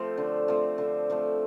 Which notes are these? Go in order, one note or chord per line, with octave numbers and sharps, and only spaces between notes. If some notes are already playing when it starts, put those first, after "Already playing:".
Already playing: F3 A3 C4 C5
D3
F3 A3 C4
D3
F3 A3 C4